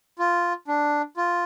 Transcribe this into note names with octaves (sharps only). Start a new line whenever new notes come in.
F4
D4
F4